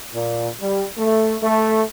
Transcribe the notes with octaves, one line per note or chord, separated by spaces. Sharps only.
A#2
G3
A3
A3